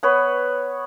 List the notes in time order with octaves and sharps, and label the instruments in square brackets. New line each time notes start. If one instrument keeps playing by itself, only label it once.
[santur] B3 B4 C#5